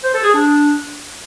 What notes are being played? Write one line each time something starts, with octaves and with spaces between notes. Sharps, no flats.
C5
A4
G#4
D4